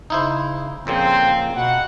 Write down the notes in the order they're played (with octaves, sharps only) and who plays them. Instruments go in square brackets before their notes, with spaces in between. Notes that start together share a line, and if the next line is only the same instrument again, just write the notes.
[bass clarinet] C#3 [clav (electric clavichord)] D#4 E4 C5
[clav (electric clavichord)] F2 A#2 C#3 [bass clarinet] A#3 [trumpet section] C4
[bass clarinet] B2 [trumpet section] F#5